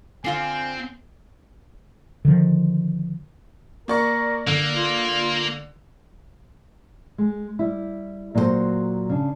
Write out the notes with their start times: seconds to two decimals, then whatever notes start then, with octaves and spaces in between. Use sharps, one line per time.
0.24 D3 C4 F4 F5 G#5
2.25 D3 D#3 F3
3.88 A#3 A#4 D5 C#6
4.47 D3 A#3
4.73 F4
7.18 G#3
7.59 G3 E4
8.35 A#2 F#3 F#4 G#4 C5
9.09 C#3 D4